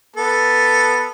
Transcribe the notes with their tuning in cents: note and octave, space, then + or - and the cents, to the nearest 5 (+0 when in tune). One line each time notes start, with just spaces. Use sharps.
B3 -5 A4 +0